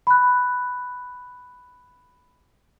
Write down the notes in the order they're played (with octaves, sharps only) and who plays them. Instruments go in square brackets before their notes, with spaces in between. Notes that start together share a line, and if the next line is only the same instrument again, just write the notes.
[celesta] B5 F#6